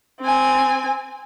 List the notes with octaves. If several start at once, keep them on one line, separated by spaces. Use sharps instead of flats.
C4 G#5